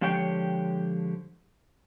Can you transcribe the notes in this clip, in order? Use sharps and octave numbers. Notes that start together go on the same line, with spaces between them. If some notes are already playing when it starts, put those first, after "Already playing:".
D3 F3 G#3 G4 C#5 G5